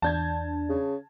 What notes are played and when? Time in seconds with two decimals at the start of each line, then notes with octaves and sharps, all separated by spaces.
0.02 E2 D4 A5 G6 G#6
0.69 C#3